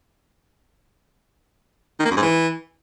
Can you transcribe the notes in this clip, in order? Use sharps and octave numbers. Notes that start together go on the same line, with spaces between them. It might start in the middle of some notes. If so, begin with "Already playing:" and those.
D#3
A#3
F#2
G#2
E3